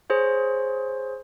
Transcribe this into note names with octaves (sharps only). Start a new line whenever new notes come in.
G#4 C5 C#5